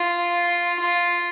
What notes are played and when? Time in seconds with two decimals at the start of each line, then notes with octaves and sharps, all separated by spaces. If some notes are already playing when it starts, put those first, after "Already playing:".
Already playing: F4
0.80 F4